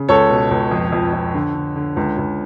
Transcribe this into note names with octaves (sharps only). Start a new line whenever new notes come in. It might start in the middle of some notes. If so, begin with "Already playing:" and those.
Already playing: C#3
C#2 A4 C#5
B2
C#2
F2
F2
F2
D3
D3
D3
C#2
C#2